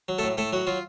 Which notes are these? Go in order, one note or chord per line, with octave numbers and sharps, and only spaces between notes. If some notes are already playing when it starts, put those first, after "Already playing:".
F#3
A3 A4
A2
A2 A3 A4
F#3 F#4
F#3 F4